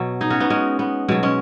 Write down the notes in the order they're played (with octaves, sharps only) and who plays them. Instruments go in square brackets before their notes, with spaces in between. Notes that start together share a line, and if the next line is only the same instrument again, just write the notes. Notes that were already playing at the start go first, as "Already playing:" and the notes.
Already playing: [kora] B2 F#3
D#4 G#4
C#4 F#4
B3 D#4
G#3 C#4
B3
B2 F#3 G#3
G#3 C#4